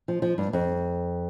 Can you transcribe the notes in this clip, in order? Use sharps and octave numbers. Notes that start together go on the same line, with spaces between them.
F3
F3
G2
F2